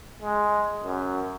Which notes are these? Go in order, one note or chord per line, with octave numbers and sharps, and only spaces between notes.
G#3
F#2